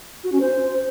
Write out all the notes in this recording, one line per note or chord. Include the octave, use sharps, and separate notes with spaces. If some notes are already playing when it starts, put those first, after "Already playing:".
F#4
C#4
C5